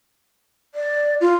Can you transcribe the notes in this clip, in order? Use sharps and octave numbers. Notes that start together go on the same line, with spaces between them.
D5
F4